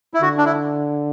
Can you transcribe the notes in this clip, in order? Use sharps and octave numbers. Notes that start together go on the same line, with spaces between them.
E4
D3 F#4
D4
E4